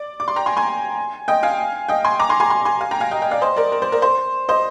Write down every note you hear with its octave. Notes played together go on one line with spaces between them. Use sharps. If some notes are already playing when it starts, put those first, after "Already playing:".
Already playing: D5
D6
C6
G5 A#5
G#5 C6
G#5 C6
D#5 G5
F5 G#5
D#5 G5
G#5 C6
A#5 D6
G#5 C6
G#5 C6
G#5 C6
G#5 C6
F5 G#5
G5 A#5
F5 G#5
D#5 G5
D#5 G5
D5 F5
C5 D#5
A#4 D5
A#4
C5
A#4 D5
C5
C5 D#5